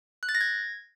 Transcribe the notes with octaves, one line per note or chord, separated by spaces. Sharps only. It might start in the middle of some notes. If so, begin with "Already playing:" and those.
F#6
A6
A#6
G#6